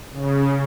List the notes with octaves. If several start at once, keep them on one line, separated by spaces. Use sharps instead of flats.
C#3